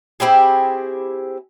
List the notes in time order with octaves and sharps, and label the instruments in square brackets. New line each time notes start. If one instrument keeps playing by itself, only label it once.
[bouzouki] C4 E4 G4 G#4